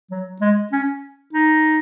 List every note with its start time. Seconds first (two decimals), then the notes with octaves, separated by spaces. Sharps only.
0.11 F#3
0.41 G#3
0.72 C#4
1.33 D#4